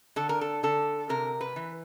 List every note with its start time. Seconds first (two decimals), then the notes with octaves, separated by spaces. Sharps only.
0.16 D3 A4
0.29 A#4
0.41 A4
0.63 D3 A4
1.09 C3 A#4
1.41 B4
1.56 E3